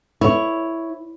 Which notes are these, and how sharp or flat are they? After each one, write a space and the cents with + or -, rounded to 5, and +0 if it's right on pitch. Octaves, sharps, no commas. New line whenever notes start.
E4 +0 C#5 +0